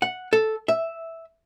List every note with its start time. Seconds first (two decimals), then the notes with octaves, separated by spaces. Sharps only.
0.02 F#5
0.33 A4
0.68 E5